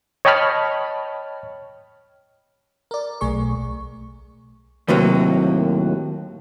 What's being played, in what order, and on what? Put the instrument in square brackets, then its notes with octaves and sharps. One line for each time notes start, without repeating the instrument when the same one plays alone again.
[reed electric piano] C#5 D#5 G5 A5 B5 F6
[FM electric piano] A#4 D5
B1 A3 G#4 C#6
[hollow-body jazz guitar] D#2 A2 C3 F#3 A#3